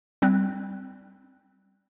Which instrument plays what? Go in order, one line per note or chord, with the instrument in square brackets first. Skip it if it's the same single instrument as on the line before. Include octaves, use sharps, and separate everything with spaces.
[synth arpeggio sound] G3 C4 F#6